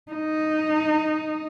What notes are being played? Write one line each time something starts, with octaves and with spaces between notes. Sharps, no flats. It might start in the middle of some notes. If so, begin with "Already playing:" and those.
D#4